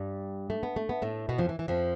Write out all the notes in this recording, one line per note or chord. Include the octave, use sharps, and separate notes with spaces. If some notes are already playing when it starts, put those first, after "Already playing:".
Already playing: G2 G3
A3
B3
A3
B3
A2 A3
B2 B3
F2 F3
E3
E3
F2 F3